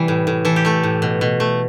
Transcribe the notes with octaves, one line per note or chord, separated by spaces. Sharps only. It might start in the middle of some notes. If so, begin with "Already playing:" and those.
Already playing: C3 E3 G3
A2
A2
E3 A4
G4
A3 A4
A2
B2
B2
A3